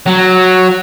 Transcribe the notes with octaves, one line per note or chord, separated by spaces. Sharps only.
F#3